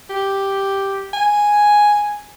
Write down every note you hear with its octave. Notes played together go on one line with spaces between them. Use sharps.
G4
G#5